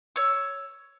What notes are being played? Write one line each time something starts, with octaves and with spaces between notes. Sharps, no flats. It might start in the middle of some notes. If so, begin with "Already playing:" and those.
C#5 E6